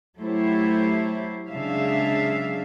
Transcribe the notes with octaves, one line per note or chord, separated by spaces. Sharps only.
F#3 A3 E4 G4 C5 C#5
C#3 F#3 G#3 D4 E5 F5